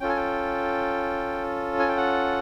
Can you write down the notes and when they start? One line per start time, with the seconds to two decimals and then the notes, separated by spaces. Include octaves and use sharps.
0.01 C#4 F4 A4 G5
0.09 G#5
0.17 G5
1.79 G#5
1.88 G5
1.97 F#5